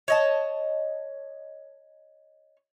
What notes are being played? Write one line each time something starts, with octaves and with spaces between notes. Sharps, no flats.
C#5 D#5 A5